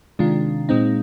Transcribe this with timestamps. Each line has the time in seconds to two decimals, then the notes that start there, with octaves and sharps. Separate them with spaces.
0.19 C3 D#3 G#3 D4 F4
0.69 A#2 G#3 C4 D#4